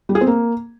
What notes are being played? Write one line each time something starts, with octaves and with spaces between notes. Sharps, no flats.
G3
G#4
C4
A#3